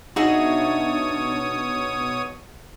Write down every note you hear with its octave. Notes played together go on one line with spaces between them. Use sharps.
B2 D4 D#4 F#4 G#4 C#5 E5 D#6